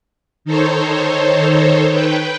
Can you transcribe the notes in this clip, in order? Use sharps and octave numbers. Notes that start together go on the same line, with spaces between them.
D#3 D#4 A4 C5 C#5
B4 G5